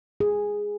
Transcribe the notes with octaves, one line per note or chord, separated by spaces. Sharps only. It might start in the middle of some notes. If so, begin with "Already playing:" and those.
G#4